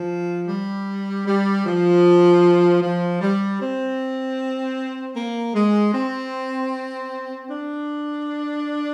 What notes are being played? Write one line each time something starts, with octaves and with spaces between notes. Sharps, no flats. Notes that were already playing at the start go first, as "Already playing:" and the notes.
Already playing: F3
G3
G3
F3
F3
G3
C4
A#3
G#3
C4
D4